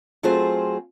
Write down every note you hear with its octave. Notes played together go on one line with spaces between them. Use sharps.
F#3 A3 C4 F4 G#4 C5